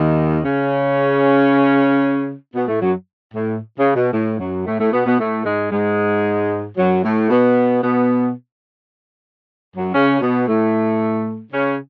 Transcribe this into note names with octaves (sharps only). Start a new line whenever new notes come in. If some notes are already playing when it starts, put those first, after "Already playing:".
Already playing: D#2 D#3
C#3 C#4
B2 B3
A2 A3
F#2 F#3
A2
C#3
B2
A2
F#2 F#3
A2 A3
A2 A3
B2 B3
B2 B3
A2 A3
G#2 G#3
G#2 G#3
F#2 F#3
A2 A3
B2 B3
B2 B3
F#2 F#3
C#3 C#4
B2 B3
A2 A3
C#3 C#4